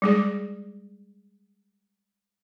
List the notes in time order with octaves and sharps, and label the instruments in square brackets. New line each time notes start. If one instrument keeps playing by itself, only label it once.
[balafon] G3 G#3 G#4